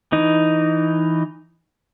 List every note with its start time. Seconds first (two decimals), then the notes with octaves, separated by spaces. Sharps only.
0.12 E3 D#4